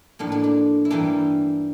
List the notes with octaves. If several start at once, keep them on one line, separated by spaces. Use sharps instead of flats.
A2 F3 A#3 D4
D4
D4
E4
G2 E3 G3 A#3 D4